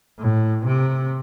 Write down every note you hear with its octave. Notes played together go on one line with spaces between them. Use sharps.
A2
C3